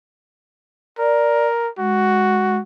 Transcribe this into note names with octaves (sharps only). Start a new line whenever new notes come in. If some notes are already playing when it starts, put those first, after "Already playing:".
A#4 D5
G#3 F#4